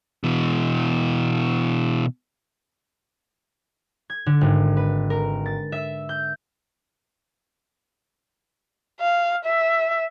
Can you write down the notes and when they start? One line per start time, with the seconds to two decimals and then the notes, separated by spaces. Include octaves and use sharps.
0.24 B2 E3
4.10 G#6
4.26 D3
4.41 G#1
4.77 B4
5.10 A#4
5.46 A6
5.72 E5
6.09 G6
9.00 F5
9.44 E5